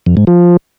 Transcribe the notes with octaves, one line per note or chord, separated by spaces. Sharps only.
F2
G#2
F3